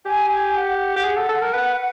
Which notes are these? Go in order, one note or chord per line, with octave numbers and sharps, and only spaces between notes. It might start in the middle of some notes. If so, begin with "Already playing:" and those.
G4 G#5
G#5
F#5
G4
G#4
A4
A4
A#4
B4